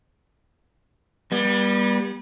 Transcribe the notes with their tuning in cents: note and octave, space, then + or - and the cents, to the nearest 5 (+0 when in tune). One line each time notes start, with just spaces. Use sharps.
G3 +15 B3 -35